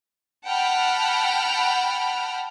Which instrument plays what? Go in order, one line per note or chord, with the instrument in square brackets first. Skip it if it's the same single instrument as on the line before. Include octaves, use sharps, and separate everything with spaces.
[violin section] F#5 G5 A5 B5 F6